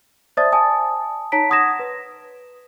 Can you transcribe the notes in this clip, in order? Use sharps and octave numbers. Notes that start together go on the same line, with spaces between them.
C5 D5 E5 A5 D#6 A6
G#5 A5 D#6
D#4 C#5 A5 A#5 B6 D7
F#5 C6 D#6 G#6 A#6 E7
B4